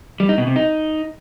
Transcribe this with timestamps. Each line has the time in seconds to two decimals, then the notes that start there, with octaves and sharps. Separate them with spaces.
0.20 G3
0.29 D#4
0.38 B2
0.47 C3
0.56 D#4